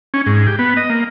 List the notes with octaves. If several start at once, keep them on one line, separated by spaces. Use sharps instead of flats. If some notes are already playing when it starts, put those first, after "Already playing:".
C#4
G#2
G4
B3
D#5
A#3